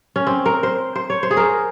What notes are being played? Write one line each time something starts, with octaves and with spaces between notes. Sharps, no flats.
C#4
C4
A#4
C5
C5
C#5
C5
G#4
A#4